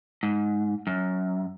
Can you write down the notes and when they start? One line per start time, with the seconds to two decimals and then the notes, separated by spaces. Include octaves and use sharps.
0.23 G#2
0.87 F#2